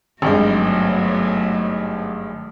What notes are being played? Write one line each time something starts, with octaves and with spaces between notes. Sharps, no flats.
G#1 G2 F#3 G#3 A3 B3